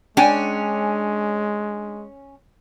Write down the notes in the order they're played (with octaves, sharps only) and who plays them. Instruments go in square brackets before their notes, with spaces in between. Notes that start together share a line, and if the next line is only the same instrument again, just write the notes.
[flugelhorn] G#3 [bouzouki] C#4 [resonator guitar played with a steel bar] D4 G5 G#5